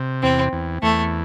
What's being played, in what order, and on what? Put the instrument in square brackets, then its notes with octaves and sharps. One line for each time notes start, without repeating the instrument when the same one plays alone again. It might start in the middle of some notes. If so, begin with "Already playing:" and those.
Already playing: [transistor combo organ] C3
[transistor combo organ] E2 [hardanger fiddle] C4
[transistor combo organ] E2
[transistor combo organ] E2 [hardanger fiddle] A3